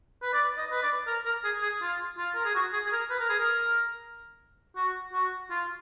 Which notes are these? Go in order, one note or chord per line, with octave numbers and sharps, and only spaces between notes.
B4
D5
D#5
B4
D5
A#4
A#4
G#4
G#4
F4
F4
A#4
G#4
F#4
G#4
G#4
A#4
B4
A#4
G#4
A#4
F#4
F#4
F4